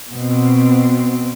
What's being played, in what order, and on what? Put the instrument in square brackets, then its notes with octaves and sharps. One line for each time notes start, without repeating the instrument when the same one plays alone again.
[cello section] B2 C4